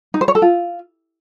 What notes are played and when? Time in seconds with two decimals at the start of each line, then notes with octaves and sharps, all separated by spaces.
0.14 D#4
0.21 C5
0.28 C#5
0.35 A4
0.42 F4